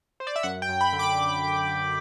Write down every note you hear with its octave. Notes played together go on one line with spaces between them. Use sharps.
C5
D5
E5
F#2 F#5
G5
F#2
B5
D3
D6